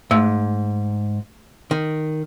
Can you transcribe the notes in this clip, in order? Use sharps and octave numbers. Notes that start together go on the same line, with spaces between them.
G#2 A3
D#3